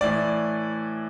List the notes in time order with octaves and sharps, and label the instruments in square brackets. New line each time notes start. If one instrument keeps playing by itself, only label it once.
[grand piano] A2 E3 D5